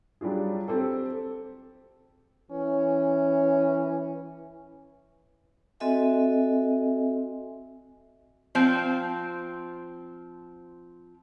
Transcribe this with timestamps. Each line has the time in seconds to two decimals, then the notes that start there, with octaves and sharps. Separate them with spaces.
0.21 F#3 G3 D4 F4 G#4
0.68 C4 G4 A4
2.51 E3 C#4
5.80 C4 F#4 A4 D#5 E5 G#5
8.55 F3 C4